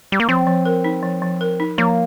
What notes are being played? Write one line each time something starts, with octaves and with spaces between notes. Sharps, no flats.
G3
A#3
F3 C4
F3
A#4
D#4
F3
F3
A#4
D#4
F3 A#3